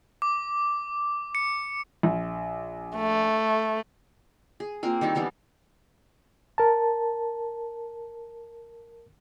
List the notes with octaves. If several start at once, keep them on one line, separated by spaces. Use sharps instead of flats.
D6
C#7
A#1
A3
G#4
A#3 C4 F4
D#3 G3 E4 A5
E3 G3 B3 A5
A#4 A5